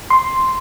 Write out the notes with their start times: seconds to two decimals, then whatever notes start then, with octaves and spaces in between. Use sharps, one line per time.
0.10 C6